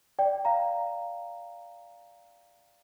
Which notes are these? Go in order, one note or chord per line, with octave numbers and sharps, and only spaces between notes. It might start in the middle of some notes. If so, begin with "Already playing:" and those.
D5 G5
F5 A#5